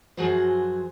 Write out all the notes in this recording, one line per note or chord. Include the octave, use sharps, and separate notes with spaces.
F#2 F3 F#3 F#4 G#4 C5